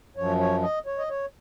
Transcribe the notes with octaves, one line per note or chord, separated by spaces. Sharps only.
F#2 F3 C#5
C#5
D#5
C#5
D#5
C#5